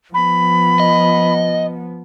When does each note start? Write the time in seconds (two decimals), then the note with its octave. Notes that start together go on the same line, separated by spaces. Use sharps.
0.14 F3 B3 B5
0.80 D#5